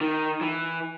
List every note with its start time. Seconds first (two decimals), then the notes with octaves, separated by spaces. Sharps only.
0.01 D#3
0.41 E3